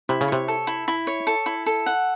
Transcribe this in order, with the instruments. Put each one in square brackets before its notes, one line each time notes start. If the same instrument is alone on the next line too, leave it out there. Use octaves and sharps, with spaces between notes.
[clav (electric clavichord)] C3 [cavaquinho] E4
[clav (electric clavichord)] C#3
[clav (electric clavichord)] C3 [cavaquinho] C#5
[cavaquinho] A4
E4
E4
C#5
A4
E4
A4
F#5